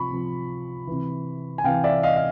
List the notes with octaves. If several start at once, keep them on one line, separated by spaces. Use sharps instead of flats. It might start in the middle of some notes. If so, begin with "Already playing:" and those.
Already playing: C3 F3 B5 C#6
C3 F3
C3 E3
G#5
C3 E3 F5 G5
D5 E5
D#5 F5
F5